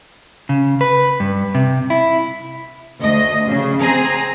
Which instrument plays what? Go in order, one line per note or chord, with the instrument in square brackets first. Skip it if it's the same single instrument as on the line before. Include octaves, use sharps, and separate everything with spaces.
[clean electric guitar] C#3
B4
G2
C3
E4
[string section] D2 D#5
C#3
C4 G#4 A#5